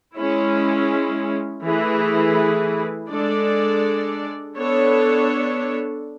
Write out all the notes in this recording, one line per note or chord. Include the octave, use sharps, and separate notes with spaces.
G#3 C#4 E4
E3 A3 E4 G#4 B4
G#3 D4 A4 D5
B3 D4 A4 C#5